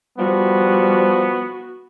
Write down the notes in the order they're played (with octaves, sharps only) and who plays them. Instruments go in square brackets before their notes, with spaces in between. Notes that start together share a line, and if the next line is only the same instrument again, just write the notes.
[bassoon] F3 [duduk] G3 [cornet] B3 [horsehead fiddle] F#4